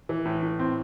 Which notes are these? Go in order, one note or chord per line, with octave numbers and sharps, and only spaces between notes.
E3
A2
A2
C4